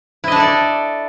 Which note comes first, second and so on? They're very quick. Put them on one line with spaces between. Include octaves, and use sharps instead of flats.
E4 D#5 D4 A4 D5